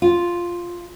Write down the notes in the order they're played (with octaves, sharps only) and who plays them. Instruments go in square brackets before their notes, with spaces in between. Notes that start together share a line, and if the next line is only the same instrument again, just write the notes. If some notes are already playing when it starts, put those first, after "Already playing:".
[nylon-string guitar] F4